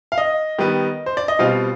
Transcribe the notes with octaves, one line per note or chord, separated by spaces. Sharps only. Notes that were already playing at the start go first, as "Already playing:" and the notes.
F5
D#5
D#3 G3 B3
C5
D5
D#5
B2 G3 C4 F4 F5